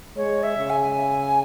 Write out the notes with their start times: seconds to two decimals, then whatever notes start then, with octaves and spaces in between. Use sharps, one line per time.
0.17 G#3 C#5
0.43 E5
0.57 C#3
0.70 G#5